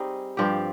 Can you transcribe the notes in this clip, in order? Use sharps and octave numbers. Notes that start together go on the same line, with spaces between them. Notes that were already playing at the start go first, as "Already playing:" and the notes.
Already playing: G3 C4 D#4 G#4
G2 F3 C4 G4